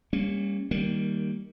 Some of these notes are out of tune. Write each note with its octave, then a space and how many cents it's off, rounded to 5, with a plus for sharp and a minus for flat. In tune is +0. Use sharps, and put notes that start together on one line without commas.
G3 +35 A#3 +0 C#4 +0
D#3 +10 G3 +0 A#3 -10